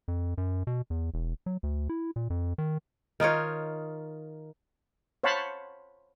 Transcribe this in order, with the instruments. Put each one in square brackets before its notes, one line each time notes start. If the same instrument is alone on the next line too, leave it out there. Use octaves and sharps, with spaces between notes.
[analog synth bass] F2
F#2
B2
E2
E1
F#3
D2
E4
A#2
F2
D#3
[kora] D#3 D#4 F4 C#5
[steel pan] C5 C#5 F5 F#5 A5 B5